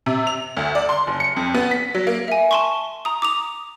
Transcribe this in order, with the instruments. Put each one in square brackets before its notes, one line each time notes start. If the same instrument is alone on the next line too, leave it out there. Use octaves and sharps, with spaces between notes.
[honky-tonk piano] C3
F7
D2
D5
C6
F#1
C#7
F2
B3
B6
F#3
A#3
[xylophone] E5 G#5
A5 C6 C#6
A#5 D#6
D6 D#6 F7